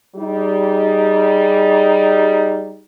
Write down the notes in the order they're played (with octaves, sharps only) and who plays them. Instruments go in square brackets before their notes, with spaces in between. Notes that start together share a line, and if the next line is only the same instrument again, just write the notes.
[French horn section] G3 D#4 G#4